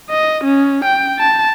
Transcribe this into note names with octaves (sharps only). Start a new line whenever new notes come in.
D#5
C#4
G5
A5